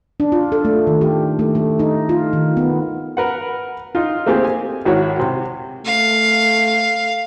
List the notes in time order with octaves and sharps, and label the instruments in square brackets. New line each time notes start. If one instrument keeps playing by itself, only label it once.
[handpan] D4
F4
A4
A3
D#3
G4
A3
A3
D#4
F4
D#3
B3
[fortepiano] A#4 B4 F#5
D#4 F4
A3 A#3 C4 G4 G#4
G#5
G#1 E4 F#4 A#4 C#5
C3
[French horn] A3 [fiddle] F5